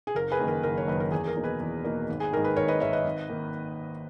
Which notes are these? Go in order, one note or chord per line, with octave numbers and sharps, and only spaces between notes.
G#4
F#1 A#4
G#4 B4
F#2 D#3 A#3
A#4
F#1 A#4
C#5
F#2 D#3 A#3 B4
A#4
E2 G#4
G#4
A#4
B2 A#3 D#4
G#4 B4
E2
B2 A#3 D#4
G#1
G#4
G#2 D#3 A#4
B4
G#1 A#4 C#5
B4 D#5
G#2 D#3 C#5 E5
B4 D#5
G#1
D#3 A#3